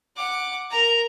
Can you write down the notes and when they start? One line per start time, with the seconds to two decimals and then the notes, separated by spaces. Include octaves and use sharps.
0.16 F#5 D6
0.70 A#4 A#5